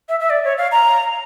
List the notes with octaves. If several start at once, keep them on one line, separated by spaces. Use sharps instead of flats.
E5
E5
D5
C#5
F5
A#5